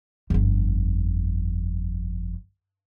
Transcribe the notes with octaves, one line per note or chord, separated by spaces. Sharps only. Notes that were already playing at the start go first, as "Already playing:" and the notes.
G1 F2